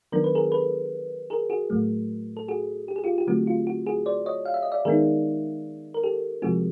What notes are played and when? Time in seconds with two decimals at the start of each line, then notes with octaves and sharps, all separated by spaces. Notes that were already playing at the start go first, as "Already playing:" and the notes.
0.12 D#3 F#3 B3 D4 A#4
0.24 B4
0.35 G#4 A#4
0.52 A4 B4
1.30 G#4 A#4
1.50 F#4 G#4
1.70 A2 F#3 A3
2.37 A4
2.48 F#4 G#4
2.88 G4
2.96 G#4
3.04 F4 G4
3.18 G4
3.27 D3 F#3 A3 C4 F#4
3.47 F4
3.67 F#4
3.86 F#4 G#4
4.06 C5 D5
4.26 C#5 D#5
4.45 F5
4.54 E5
4.62 D#5
4.72 D5 E5
4.85 D#3 G#3 B3 D#4 G#4 A#4
5.94 A#4
6.03 G4 A4
6.42 C3 F3 G#3 C4 F#4 G#4